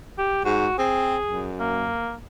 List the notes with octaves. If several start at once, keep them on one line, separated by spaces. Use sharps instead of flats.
G4
G#2 F#4
C4 G#4
F#2
A#3